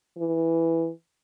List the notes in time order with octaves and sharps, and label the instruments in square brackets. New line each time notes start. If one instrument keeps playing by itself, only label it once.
[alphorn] E3